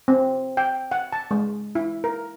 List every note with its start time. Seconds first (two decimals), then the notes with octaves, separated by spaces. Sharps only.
0.08 C4
0.57 G5
0.92 F#5
1.12 A5
1.31 G#3
1.75 E4
2.04 A#4